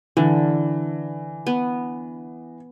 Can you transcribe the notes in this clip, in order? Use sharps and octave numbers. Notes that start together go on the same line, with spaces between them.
D3 E3
B3